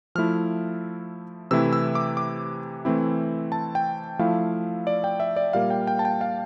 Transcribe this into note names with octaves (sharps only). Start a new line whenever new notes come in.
F3 A3 E4 F6
C3 E3 A3 E4 E6
E6
D6
D6
E3 A3 C4 E4
A5
G5
F3 A3 E4 F5
D5
G5
E5
D5
A#2 G3 A#3 F5
G5
G5
A5
G5
F5